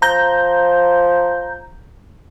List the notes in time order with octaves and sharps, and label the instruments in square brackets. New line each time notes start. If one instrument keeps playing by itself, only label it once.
[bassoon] F3 [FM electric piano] A#5 G6